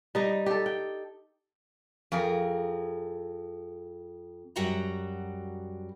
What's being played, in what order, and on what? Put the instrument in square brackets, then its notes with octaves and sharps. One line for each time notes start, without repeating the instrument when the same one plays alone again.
[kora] G3 D#4 D#5
G4 A4
G5
[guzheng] F2 G#4 A#4 E5
[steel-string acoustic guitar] F#2 G3 F#4 F#5 G5 A#5